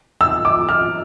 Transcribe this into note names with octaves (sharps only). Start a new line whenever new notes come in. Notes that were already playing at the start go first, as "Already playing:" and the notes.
E6
D6
F6